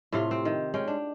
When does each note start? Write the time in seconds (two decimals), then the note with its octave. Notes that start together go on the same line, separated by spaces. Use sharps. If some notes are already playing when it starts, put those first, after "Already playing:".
0.12 A2 C3 F4
0.31 C4
0.45 D#3
0.74 G#3 C#4 G5
0.88 D4